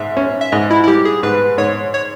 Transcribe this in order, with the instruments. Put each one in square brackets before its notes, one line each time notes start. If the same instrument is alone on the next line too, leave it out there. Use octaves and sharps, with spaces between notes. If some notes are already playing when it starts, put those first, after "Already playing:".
Already playing: [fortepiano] G#2 [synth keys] E5
[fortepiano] C#4
[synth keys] E5
[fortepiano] G#2 [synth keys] D#5
[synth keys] E4
E4
[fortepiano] G3 [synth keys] G4
[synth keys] G#4
[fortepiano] G#2 [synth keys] B4
[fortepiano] G#2 [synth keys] C#5
[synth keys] C#5